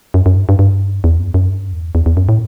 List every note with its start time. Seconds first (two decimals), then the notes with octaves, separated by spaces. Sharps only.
0.14 F#2
0.26 F#2
0.36 G2
0.49 G2
0.59 G2
1.04 E2
1.19 F#2
1.34 F#2
1.50 G2
1.69 F#2
1.73 E2
1.95 E2
2.06 E2
2.17 F#2
2.29 A2